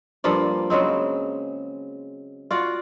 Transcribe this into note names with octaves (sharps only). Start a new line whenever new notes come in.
G2 F3 A#3 D5
C#3 F#3 G#3 C4
F4 F#4 D5